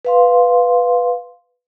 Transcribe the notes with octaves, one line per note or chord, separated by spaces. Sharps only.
B4 F5 C6